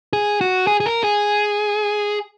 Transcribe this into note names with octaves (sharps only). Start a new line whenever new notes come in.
G#4
F#4
G#4
G#4
A#4
G#4